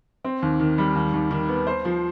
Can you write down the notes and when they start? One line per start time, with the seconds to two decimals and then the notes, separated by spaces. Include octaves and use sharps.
0.25 C4
0.42 D#2
0.60 D#3
0.78 G3
0.95 D#2
1.13 D#2
1.31 D#3
1.49 B3
1.67 C5
1.85 F3